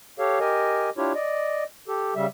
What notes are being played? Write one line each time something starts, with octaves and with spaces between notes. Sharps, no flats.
G4 A4 C#5 F5
G4 A#4 D#5 G#5
D4 E4 F4 G4 C#5
D5 D#5
G4 A4
C#3 G3 E5